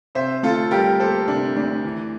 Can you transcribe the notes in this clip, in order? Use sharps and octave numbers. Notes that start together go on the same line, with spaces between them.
C3 C5 E5
D2 F4 A4
G3 G4 A#4
A#3 A4 C5
C3 D4
D2 D4
E3